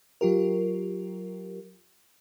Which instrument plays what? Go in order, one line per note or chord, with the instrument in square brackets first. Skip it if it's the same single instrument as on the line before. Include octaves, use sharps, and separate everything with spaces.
[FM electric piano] F#3 F4 G4 A#4